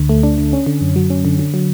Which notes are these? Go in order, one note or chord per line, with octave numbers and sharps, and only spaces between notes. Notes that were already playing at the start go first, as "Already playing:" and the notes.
Already playing: D2 D3
A3
D4
D3
C#4
D3
F#2
F#3
C#4
D3
D3
F#3